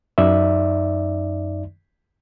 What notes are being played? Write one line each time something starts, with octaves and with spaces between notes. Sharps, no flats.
F#2 D#4 D5 E5